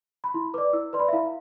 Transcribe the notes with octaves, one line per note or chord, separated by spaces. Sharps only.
B5
E4 C6
B4 D5 D6
E4 E6
B4 D5 C6
B5
E5
E4 F5